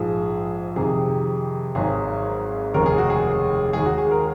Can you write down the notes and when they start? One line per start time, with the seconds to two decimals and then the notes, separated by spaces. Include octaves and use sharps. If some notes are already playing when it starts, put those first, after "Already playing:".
Already playing: A#1 G#2 F3 G#4
0.76 F2 C3 D#3 G#4
1.75 G#1 G#2 F#3 A#3 G#4
2.74 F1 D#2 C#3 G#3 A#4
2.86 G#4
2.98 F#4
3.10 G#4
3.73 D#2 D#3 G#3 G#4
3.86 F#4
3.98 G#4
4.11 A#4